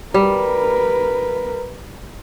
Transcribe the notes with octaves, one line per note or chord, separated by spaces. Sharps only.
G3 A#4 B4